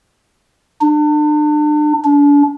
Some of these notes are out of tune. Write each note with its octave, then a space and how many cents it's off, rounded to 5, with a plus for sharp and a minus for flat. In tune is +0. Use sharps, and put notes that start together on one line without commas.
D4 +35
D4 -35